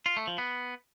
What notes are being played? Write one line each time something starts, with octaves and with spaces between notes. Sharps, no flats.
F4
A3
F3
B3